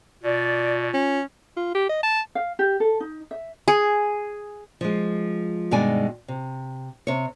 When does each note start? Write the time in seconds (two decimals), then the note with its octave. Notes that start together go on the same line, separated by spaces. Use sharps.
0.23 B2 F4 D5
0.94 C#4
1.57 F4
1.75 G4
1.89 D#5
2.03 A5
2.35 F5
2.59 G4
2.80 A4
3.00 D#4
3.31 E5
3.68 G#4
4.81 F3 G#3
5.71 G2 B2 D#3 G#3 D5 G#5
6.28 C3
7.07 C3 C#5